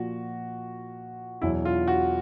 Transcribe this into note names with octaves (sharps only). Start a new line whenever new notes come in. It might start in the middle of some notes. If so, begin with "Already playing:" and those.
Already playing: A#2 F3 F#4
E2 B2 F#3 E4
F4
F#4